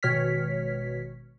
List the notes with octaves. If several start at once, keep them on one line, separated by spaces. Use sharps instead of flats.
G#1 B2 C#5 F6 B6